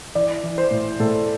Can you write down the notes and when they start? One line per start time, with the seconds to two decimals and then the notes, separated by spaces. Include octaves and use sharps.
0.15 E3 D5
0.43 E3
0.58 C5
0.71 A2
1.00 A2 A4